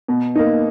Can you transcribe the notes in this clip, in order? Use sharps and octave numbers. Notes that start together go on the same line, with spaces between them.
B2
A#3 D#4